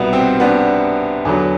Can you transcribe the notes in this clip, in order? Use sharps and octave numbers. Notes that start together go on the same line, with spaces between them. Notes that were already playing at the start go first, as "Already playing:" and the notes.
Already playing: C2 B2 G3 B3
C4
B3 D4
E2 D3 F#3